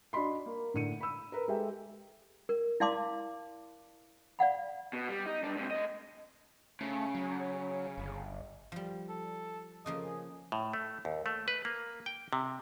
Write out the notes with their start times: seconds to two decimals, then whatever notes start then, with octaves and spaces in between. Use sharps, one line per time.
0.13 D4 F#4 D#5 B5 C6
0.46 A#3
0.74 A2 D3 C#7 D#7
1.01 B5 E6
1.32 A#4 B4
1.48 G#3 G4 A4 E5 G5
2.49 A#4
2.80 E4 D5 F5 A5 C6 D6
4.39 D5 F5 F#5 B5
4.93 B2
5.09 G3
5.26 D#4
5.44 G2 D4
5.57 G#2 C3
5.71 A3 D#5
6.81 C#3 A3
7.15 F#3
7.98 G1
8.72 F3 G3
9.09 A4
9.86 C#3 F3 A#3 D#5
10.05 G#4
10.52 A2
10.73 A3
11.05 D#2
11.26 A3
11.48 B4
11.65 A#3
12.06 G5
12.33 C3